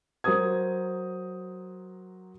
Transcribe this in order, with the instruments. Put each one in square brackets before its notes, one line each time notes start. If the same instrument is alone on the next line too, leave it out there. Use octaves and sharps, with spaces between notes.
[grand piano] F#3 A#4 C5 D#6 G#6